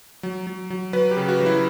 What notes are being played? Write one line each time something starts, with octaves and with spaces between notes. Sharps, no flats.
F#3
F#3
F#3
F#3 B4
G4
C#3
F#4
F#3
E4